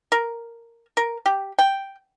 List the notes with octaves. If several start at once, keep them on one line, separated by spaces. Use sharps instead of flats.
A#4
A#4
G4
G5